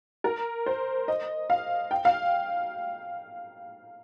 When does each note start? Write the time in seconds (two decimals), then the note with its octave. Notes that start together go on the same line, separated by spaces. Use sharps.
0.24 A#4
0.66 C5
1.08 D#5
1.50 F5
1.91 G5
2.05 F5